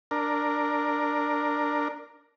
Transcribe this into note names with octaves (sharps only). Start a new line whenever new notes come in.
D4 A#4